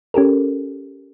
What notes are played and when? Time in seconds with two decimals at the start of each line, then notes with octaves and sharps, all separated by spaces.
0.14 C#4 G4 A4 A#4